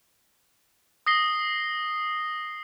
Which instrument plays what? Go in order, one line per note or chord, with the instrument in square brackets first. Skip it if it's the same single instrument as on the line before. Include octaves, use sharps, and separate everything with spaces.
[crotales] D#6 A#6 C7 G7